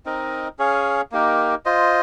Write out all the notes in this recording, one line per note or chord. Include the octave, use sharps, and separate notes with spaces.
C4 D#4 A#4 D#5
C#4 G#4 C#5 F5
A#3 D#4 G4 A#4
F4 C5 D#5